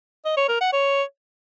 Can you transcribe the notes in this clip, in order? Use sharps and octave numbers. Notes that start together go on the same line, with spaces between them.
D#5
C#5
A#4
F#5
C#5